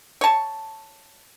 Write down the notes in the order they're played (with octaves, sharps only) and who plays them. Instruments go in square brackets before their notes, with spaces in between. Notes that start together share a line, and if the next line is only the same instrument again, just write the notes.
[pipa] C#5 A5